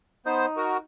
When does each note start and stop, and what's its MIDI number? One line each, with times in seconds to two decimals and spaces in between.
0.26 0.46 59
0.26 0.79 63
0.26 0.46 72
0.57 0.77 66
0.57 0.77 70